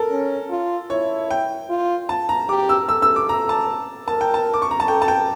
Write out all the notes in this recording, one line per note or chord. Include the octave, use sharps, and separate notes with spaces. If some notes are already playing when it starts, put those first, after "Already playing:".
Already playing: A4 A#4
C#4
F4
E4 C#5
G5
F4
A5
A#5
G4 D6
E6
A4 E6
E6
D6
A#5
A5
A#4 A5
G5
A5
D6
C#6
A#5
A5
A4 G5
A5
G5